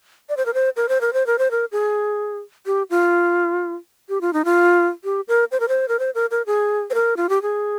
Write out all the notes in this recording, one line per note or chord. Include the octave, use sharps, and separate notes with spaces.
D5
C5
A#4
C5
A#4
C5
A#4
C5
A#4
C5
A#4
G#4
G4
F4
G4
F4
D#4
F4
G4
A#4
C5
A#4
C5
A#4
C5
A#4
A#4
G#4
C5
A#4
F4
G4
G#4